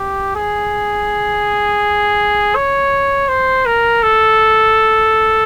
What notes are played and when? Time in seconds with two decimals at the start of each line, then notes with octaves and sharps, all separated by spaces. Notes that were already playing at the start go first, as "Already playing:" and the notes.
Already playing: G4
0.36 G#4
2.56 C#5
3.29 C5
3.66 A#4
4.03 A4